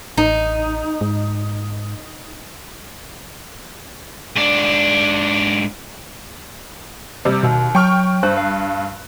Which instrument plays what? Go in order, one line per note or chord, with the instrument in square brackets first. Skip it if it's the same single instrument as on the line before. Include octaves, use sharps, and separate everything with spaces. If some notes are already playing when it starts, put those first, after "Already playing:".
[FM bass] A1 [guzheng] D#4
[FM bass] G#2
[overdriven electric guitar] G#2 D4
[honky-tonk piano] C3 G3
[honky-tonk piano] D#2 [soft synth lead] B2
[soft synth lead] F#3 [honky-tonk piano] G5 C#6 F6
[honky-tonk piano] G2 F#6 [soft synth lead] C5
[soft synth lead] F5